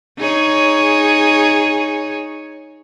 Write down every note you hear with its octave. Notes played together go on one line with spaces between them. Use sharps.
D#4 G#4 C#5